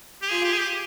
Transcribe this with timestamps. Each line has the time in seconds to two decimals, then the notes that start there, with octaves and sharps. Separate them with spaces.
0.22 G4
0.30 F4 G#4
0.44 G4
0.53 G#4
0.58 G4